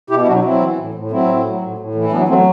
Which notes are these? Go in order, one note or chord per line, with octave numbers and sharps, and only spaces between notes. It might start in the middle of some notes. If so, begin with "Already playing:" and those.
B2 E4 G4
E4
F#3 D4 F#4
F#3 C4 E4
E3
A2
A2
F#3 C4 E4
A2
F#3
A2
A2
E3
E4
F#3 B3 D4
F#3 A3 C4